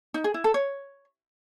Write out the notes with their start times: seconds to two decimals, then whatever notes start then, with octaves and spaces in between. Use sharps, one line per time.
0.14 D#4
0.24 G#4
0.34 E4
0.44 A4
0.54 C#5